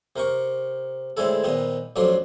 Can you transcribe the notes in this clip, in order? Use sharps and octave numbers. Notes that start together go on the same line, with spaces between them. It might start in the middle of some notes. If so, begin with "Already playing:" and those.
C3 A#4 G5 C#6
A2 D3 G#3 C4 E4 A4
A#2 D#3 B3 C4
A1 F2 F3 F#3 D4 C6